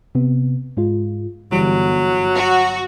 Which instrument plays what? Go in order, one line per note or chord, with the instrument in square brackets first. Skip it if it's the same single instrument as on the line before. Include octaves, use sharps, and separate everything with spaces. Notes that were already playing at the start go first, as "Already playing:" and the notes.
[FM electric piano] C3 B3
G#2 G#3 F4
[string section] G1 [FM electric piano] E3 G3 [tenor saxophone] F#3
[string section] F#4 [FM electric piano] C#6